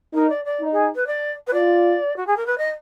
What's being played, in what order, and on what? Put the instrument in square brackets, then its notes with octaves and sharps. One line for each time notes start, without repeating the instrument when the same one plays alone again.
[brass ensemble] D#4 [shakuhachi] A#4
[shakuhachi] D5
D5
[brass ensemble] D#4
[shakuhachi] G#4
B4
D5
B4
[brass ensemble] F4 [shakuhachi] D5
[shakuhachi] F#4
G#4
A#4
B4
D#5